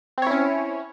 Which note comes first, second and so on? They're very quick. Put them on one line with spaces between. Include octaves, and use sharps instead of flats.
C4 C#5 E4 C#4